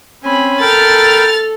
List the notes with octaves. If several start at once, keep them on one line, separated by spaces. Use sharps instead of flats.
C4 C#4 G#5 B5
A4 A#4 G5 B5 F6 A6